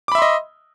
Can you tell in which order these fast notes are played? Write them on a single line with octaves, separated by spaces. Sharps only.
D6 B5 E5 C6 D#5